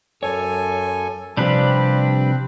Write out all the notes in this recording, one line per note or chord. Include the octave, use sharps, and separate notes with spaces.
F#2 A4 C#5 G#5
C3 F3 G3 C4 D4 B4